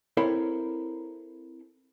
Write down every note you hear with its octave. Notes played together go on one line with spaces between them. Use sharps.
C4 E4 A4 A#4 C5 C#5